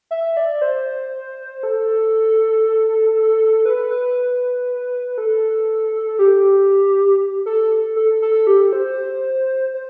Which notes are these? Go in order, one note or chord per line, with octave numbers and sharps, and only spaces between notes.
E5
D5
C5
A4
B4
B4
A4
G4
A4
A4
A4
G4
C5
C5